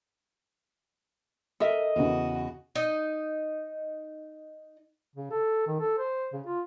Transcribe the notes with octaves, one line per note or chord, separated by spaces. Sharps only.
A4 A#4 D#5 E5
E2 C#3 F#4
D#4 D#5
C#3
A4
D#3
A4
C5
C#3
F4